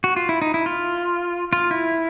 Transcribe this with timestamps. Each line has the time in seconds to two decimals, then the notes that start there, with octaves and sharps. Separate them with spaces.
0.04 F#4
0.16 F4
0.29 E4
0.42 D#4
0.54 E4
0.66 F4
1.53 F4
1.71 E4